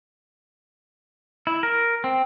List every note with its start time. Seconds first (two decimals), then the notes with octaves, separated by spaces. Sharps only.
1.47 E4
1.63 A#4
2.04 C4